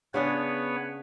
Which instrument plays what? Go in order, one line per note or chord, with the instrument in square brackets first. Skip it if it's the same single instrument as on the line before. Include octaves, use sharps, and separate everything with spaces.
[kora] C#3 D4 G#4 [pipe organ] B3 B4 C#5